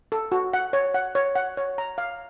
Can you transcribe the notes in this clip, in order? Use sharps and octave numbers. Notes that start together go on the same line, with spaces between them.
A4
F#4
F#5
C#5
F#5
C#5
F#5
C#5
A#5
F5